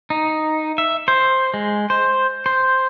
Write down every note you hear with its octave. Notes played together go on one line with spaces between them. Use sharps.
D#4
E5
C5
G#3
C5
C5